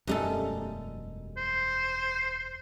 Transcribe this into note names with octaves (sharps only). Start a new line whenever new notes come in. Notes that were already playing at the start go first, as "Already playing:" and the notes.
E1 F#2 G3 A3 D#4 A4
C5